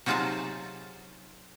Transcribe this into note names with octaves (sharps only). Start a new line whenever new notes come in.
C3 F#3 D#4 F4 G#4 A5